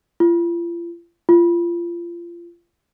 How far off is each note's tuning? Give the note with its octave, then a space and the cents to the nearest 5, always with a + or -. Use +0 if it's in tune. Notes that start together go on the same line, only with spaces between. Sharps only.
F4 -40
F4 -25